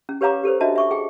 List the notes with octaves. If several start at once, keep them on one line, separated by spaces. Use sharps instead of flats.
C#4
G4 B4 C#5 F5 A#5 D6
G4 A4 B4 C5
D4 F#4 D#5 E5 A5
E5 C#6 D6
G#4 G5